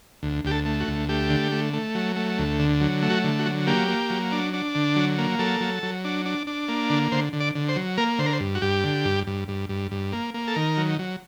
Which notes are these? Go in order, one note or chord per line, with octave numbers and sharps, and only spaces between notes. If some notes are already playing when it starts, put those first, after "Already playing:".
D2
D2 G4
A4
A3
F#4
D2
A3 G4
D3
A3
A3
F#3
A3
D2
D3
F#3
A3
F#4
D3
F#4
F#3
A#3 G4
A#3
F#3
D4
D4
D3
F#3
A#3
F#3 A4
F#3
F#3
D4
D4
D4
A#3
D3
D3 C5
D3
D5
D3
C5
F#3
A#3 A#4
D3 C5
A#4
C5
G2
F#4
G2 G4
D3
G2
G2
G2
G2
G2
A#3
A#3
A4
D#3 A#4
F#3
F#3